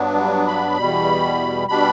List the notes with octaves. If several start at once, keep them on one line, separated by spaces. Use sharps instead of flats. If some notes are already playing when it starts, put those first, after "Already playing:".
Already playing: G2 F#3 B3 D4
B5
E2 B2 G3
B2 G3 D4 B5